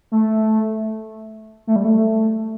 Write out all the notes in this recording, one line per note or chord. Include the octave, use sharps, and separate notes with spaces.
A3
A3
G3
A3